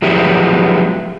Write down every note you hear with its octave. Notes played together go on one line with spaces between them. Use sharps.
F3 F#3 G#3 B3 E4 G4